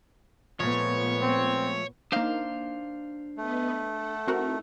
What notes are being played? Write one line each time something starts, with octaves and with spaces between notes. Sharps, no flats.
A#2 F3 G#3 A3 B3 C#5
C4
A#3 D4 D#4 C5 F5
A3 B3 B4 D#5
A4 F#5
C4 D#4 E4 F#4 A#4